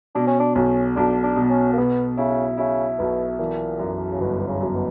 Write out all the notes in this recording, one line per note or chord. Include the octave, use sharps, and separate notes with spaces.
B2 D4
C#4
D4
B1 C#4
B1 D4
D4
B2
C#4
A#3
B2 B3
C#3 E4
C#3 E4
B1 B2
A#2 E3
F#2
C#3
G1 B2
B2
C#3
F#2
B2